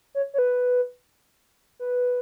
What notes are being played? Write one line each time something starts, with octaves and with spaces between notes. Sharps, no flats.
C#5
C#5
B4
B4